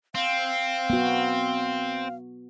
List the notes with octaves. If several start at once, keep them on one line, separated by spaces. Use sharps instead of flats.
C4 F5
B3 F#4